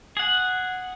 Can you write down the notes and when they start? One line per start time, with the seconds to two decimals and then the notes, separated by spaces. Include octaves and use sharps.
0.17 G#4 F#5